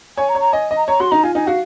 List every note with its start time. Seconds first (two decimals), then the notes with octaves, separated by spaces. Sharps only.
0.17 C#5 G#5
0.29 A#5
0.35 C#5
0.40 A#5
0.53 D#5 G#5
0.71 D#5
0.77 A#5
0.88 C#5 A#5
1.00 F#4 C6
1.11 D#4 A#5
1.23 F4 G#5
1.35 D#4 G#5
1.47 F#4 F5